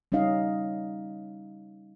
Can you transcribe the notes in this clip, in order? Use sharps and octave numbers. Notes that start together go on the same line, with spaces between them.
G3 C#4 D#4 D#5 F5